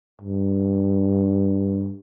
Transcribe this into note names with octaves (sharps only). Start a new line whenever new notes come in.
G2